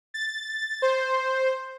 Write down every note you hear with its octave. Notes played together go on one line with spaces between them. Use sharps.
A6
C5